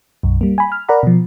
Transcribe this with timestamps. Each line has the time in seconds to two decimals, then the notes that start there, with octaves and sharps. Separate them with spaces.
0.23 B1 F#2
0.41 G3 A#3
0.58 G#5 B5
0.72 F6
0.89 A#4 D5 F#5 A#5 B5
1.03 B2 F3